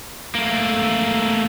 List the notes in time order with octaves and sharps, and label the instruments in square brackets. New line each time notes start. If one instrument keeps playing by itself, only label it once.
[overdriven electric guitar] A3 A#3